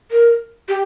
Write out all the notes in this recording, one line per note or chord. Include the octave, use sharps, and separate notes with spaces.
A#4
G4